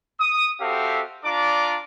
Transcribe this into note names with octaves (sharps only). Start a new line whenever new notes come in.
D#6
C4 F#4 G4 A4 E5 F5
D4 F4 D5 A#5 D6